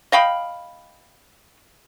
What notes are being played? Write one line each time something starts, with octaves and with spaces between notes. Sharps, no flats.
D#5 F5 G5 B5